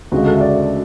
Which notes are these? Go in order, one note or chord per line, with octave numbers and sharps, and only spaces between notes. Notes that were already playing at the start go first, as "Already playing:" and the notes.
D2 C#3 G#3 F#4
A4
E5
D5
D5